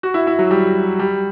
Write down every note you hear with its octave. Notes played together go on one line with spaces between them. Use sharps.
F#4
E4
E4
F#3
G3
G3